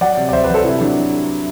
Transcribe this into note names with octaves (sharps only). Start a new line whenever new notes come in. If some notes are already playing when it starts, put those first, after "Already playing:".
F#3 D5 F#5
C3
D5
F#3 C5 E5
B4 D5
F#3
A4 C5
C3 E4
F#3 D4